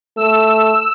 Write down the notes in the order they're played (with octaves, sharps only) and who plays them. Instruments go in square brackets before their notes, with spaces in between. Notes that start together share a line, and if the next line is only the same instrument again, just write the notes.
[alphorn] A3 [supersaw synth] E6